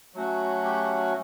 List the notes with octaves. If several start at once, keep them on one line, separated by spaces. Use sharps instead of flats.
F#3 A3 C#4 F#4
G4